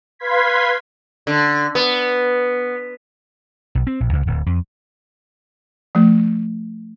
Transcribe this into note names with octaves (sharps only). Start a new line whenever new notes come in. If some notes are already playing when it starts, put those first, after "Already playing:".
B4 F5 C6 G#6 B6
D3
B3
B1
C4
A#1
C#2
D1
F2
F3 A3